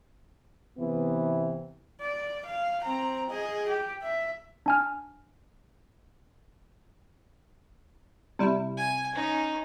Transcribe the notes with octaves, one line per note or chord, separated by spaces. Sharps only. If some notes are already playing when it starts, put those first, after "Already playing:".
C3 E3 B3
D5
F5
C4 A#5
G#4 D#5
G4
E5
D4 G#5 F6
C3 G3 E4
G#5
C#4 D#4